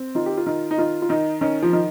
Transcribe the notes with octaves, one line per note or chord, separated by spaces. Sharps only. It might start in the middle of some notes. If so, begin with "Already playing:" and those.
Already playing: C4
D#3 F4
G4
F4
D#3
D#4
D#3 F4
F4
D#3 D#4
D#3 C#4
F3
D#3